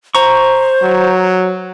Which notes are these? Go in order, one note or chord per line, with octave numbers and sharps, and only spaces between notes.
C5 A#5 C#6
F#3